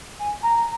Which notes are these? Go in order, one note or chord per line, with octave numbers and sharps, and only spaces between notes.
G#5
A#5